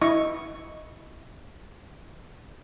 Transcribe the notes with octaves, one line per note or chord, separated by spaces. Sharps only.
E4 D#5 C#6